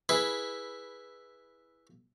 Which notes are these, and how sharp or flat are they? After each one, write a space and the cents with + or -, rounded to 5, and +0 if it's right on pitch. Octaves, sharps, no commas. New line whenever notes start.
E4 +0 G#4 +0 B4 -5